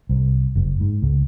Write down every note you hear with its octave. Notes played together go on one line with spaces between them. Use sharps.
C2
F#1
G#2
C#2